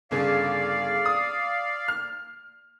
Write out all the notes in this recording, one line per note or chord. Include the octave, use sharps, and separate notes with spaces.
G1 C#3 G#4 D5 F5
D#6
F6